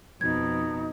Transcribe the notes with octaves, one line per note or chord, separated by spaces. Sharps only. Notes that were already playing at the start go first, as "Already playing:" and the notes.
F2 B2 D#4 G#6